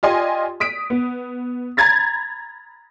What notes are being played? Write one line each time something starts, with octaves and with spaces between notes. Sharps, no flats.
F4 G4 D5 D#5 G#5 C6
D#6 B6 D7
B3
A#5 B5 G#6 A6 B6